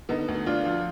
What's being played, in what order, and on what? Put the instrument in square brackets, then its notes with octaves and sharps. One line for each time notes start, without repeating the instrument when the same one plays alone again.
[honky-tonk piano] D3 B3 D#4
D2
D2 D4 F4
F3